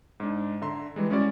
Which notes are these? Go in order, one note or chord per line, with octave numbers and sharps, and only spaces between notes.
G#2 D4
D3 E5 A#5 C6
E3 G3 G#3
G#3 C#4 E4 F#4 D5